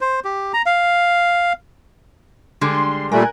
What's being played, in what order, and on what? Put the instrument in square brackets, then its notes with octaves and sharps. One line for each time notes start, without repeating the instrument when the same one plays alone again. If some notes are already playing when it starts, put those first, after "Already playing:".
[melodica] C5
G4
A#5
F5
[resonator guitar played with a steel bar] D3 G3 G#3 [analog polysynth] C6
[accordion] A#2 G3 A3 [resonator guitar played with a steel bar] A#4 [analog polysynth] G#5 F#6